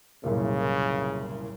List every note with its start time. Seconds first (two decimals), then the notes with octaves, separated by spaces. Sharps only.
0.24 F#1 C2 A#2 C#3